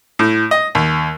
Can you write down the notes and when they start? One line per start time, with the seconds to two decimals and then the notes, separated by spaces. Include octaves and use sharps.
0.19 A2
0.51 D#5
0.75 D#2